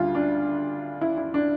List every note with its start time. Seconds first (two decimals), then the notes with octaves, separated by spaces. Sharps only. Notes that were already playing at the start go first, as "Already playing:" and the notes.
Already playing: D2 D3 G3 F4
0.15 D4
1.01 E4
1.18 E4
1.34 D4